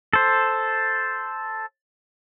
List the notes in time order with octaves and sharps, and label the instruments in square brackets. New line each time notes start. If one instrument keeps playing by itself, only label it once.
[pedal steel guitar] A4 C5